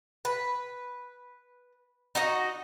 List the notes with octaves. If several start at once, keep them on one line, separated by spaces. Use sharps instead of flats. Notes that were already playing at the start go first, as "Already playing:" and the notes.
B4
D#4 F#4 D#5